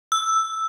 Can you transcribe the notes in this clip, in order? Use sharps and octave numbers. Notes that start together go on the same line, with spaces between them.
E6